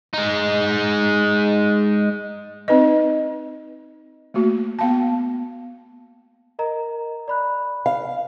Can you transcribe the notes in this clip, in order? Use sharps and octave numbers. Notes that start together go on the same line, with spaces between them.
G#3 D#4
C4 D#4 B4 D#5
A3 A#3 F#4
B3 F5 A5
A#4 D#5 A#5
D5 B5 F#6
F5